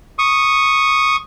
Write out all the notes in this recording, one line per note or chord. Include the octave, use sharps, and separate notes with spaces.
C#6 D#6